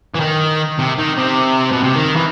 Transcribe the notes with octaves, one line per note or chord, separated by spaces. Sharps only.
E3
D#3
C3
D#3
C3
B2
C3
D#3
E3